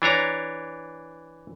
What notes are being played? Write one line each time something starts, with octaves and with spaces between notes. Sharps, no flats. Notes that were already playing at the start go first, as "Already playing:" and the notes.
E3 D4 C#5 A#5